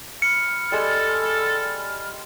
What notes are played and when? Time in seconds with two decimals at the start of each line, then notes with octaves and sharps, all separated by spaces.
0.22 B5 F6 C#7
0.72 G3 G#3 G#4 A4